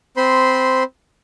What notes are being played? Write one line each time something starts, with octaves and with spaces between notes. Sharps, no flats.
C4 C5 B5 C6